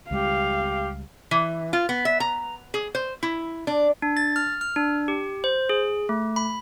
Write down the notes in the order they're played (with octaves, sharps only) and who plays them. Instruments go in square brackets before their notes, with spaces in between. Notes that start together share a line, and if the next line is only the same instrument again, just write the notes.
[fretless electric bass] C#2 G3 G#3 [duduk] G4 [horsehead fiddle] F5
[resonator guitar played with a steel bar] E3
F4
B3
E5
A#5
G#4
C5
E4
D4
[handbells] D4
A6
F6
F6
D4
G4
C5
G#4
A3
B5